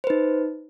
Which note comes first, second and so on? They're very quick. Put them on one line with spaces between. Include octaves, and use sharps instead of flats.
C5 B4 D#4